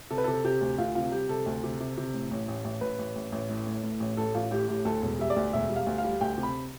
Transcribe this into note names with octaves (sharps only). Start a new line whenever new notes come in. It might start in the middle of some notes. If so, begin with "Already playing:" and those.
C3 A4
B4
C3 A4
C3 G4
D2
D2 F4
C3 F4
G3 G4
C3 A4
D2
C3
C3
C3
A2
A1
A1
A1
A1 B4
A1
A1
A1
A2
A2
A2
A1
A1 A4
A1 F4
A2 G4
A2 G4
D2 A4
E1
G3 E5
D5
D2
E1 E5
G3
F5
D2
F5
G3
D2 G5
C3
B5